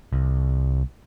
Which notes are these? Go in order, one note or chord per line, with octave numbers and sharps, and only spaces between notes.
C2